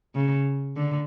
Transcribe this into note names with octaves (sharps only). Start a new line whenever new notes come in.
C#3
D3